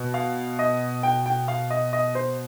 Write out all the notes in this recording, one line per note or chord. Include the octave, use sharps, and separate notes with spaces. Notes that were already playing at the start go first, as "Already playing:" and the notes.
Already playing: B2
F5
D#5
G5
G5
F5
D#5
D#5
C5